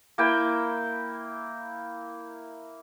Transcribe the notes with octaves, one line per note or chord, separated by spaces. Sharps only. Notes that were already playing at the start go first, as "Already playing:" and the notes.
A#3 E4 G5